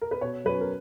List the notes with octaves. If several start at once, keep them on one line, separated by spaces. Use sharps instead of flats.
A#4
B4
B2 C#5
F#3 C#4 B4
A#4